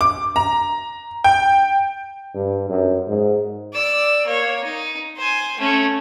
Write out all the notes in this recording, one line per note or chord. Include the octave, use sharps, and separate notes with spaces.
D6
A#5
G5
G2
F#2
G#2
D5 E6
A#3 C#5
D#4
C5 G#5
A3 C#4